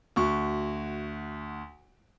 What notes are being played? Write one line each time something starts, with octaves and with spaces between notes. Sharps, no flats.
D2 F#4 C#6